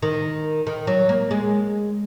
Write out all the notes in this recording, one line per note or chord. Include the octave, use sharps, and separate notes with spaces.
D#3
D#3
F#3
A#3
G#3